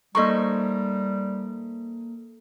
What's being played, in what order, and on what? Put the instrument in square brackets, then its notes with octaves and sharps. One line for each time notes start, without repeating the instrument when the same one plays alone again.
[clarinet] G3 [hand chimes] A#3 A4 A#5 [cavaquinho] D#4 C5 C#6